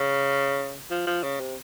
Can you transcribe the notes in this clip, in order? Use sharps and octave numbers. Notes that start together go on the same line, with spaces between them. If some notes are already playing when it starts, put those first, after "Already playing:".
Already playing: C#3
F3
F3
C#3
C3